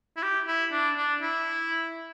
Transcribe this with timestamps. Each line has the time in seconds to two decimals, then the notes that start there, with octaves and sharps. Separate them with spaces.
0.17 E4
0.23 G4
0.47 E4
0.72 D4
0.97 D4
1.22 E4